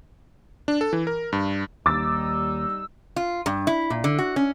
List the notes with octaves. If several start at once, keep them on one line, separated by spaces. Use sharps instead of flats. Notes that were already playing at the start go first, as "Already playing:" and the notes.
D4
A4
E3
A#4
G2
D#2 G3 D#4 D6 E6 A6
F4
G2
E4
A#2
D3
F#4
C#4